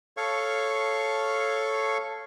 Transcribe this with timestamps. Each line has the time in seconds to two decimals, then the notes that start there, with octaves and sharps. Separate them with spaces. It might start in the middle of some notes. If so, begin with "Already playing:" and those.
0.17 A4 C#5 F5 C#6